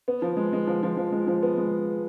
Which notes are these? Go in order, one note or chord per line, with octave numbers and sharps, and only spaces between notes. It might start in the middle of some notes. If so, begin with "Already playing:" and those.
B3
F3
G#3
G#3
F3
F3
F3
G#3
F3
B3
G#3